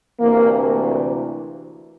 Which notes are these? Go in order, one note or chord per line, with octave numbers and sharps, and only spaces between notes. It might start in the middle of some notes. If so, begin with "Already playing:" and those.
D2 C3 E3 A#3